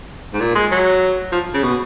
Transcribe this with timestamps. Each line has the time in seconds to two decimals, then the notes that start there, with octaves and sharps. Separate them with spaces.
0.34 G#2
0.41 A#2
0.55 G#3
0.72 F#3
1.32 F3
1.54 C#3
1.64 B2